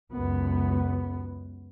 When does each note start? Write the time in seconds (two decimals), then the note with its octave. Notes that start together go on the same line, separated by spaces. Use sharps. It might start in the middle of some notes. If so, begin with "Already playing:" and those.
0.13 C#2 F#2 B3